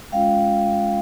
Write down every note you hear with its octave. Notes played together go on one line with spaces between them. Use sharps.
G#3 C#4 F4 F5 G5